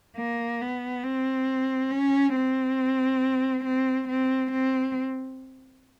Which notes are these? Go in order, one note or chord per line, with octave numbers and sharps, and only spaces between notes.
A#3
B3
C4
C#4
C4
C4
C4
C4